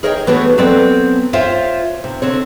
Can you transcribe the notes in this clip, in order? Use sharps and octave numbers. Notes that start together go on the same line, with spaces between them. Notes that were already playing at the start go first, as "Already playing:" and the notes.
G#4 A#4 C#5 D#5 F#5 G5
E3 A3 B3 D4 F#4 C#5
F#3 B3 C4 A4 B4 D5
F4 C5 C#5 E5 F5 G5
C3
D3 C4 C#5